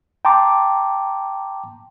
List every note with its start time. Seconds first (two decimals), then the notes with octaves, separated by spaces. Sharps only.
0.25 G5 A5 A#5 C6 D6